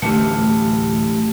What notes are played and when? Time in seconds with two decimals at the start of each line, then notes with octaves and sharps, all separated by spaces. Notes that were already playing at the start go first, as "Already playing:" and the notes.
0.02 D1 A1 D2 A3 G4